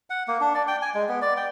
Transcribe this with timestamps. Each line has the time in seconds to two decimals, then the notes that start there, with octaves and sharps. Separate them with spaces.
0.10 F#5
0.28 A#3
0.41 D4
0.55 D5
0.68 G5
0.82 G#5
0.94 G#3
1.09 B3
1.22 D5
1.37 G5